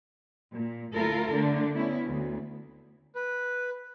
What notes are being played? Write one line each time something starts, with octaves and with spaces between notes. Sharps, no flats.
A#2
D2 E4 F4 A4 A#4
D3 A3 D4
B3 C#4 E4
D2
B4